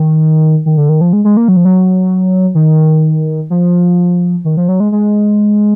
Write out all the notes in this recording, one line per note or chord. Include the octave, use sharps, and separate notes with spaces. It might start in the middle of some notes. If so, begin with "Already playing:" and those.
Already playing: D#3
D#3
D3
D#3
F3
G#3
G#3
A#3
F#3
F3
F#3
D#3
F3
D#3
F3
F#3
G#3
G#3